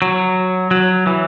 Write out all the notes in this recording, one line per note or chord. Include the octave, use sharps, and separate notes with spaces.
F#3
F#3
E3